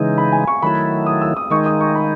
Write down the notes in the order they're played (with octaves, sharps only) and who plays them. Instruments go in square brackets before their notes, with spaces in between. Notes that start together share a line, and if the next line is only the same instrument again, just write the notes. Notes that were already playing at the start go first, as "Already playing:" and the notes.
Already playing: [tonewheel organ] C#3 E3 G#3 D#4
[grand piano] B5
G#5
C#6
[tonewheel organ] D#3 F#3 A3 E4 [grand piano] B5
[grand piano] D#6
E6
D#6
[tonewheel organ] D#3 G#3 D#4 [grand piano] C#6
[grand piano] D#6
C#6
B5